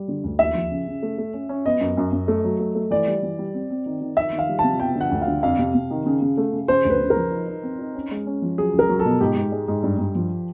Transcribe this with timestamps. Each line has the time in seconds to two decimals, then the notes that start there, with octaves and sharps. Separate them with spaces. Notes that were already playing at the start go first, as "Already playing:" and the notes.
Already playing: G3
0.08 D3
0.24 D2
0.39 D#2 E5
0.55 F3
0.71 C#3
0.87 C#3
1.02 A3
1.18 A3
1.34 C#4
1.49 C#4
1.66 B3 D#5
1.81 F#2
1.97 F#2
2.12 F#2
2.28 A3
2.44 F#3
2.59 A3
2.75 A3
2.91 E3 D5
3.07 G3
3.23 E3
3.38 G3
3.54 C4
3.70 C4
3.86 D#3
4.01 D#3
4.17 D#3 E5
4.32 D#3
4.39 F5
4.49 G3
4.59 C3 A5
4.80 B3 G5
4.95 D3
5.01 F#5
5.11 D2
5.22 F5
5.27 D3
5.43 F2 F5
5.59 C3
5.74 C3
5.90 D#3
6.06 C#3
6.22 C#3
6.37 A3
6.53 C#3
6.68 C#3 C5
6.85 D2
6.90 B4
7.00 C#3
7.10 A#4
7.16 F3
7.31 D#4
7.47 D#4
7.63 C4
7.79 D#4
7.95 C#4
8.11 G#3
8.27 C#4
8.42 F3
8.58 F#3 G#4
8.73 C#2
8.79 A#4
8.89 F#3
8.99 A4
9.05 B2
9.20 G#2 G4
9.36 G#2
9.52 G#3
9.68 G#2
9.83 G2
9.99 G2
10.15 F3